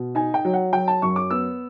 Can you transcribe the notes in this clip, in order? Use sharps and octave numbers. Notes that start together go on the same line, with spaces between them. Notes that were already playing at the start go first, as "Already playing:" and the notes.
Already playing: B2
D#4 G#5
G5
F#3
F#5
F#3 G5
A5
F#2 C#6
D6
B3 E6